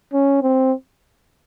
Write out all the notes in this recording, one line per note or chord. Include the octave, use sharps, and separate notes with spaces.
C#4
C4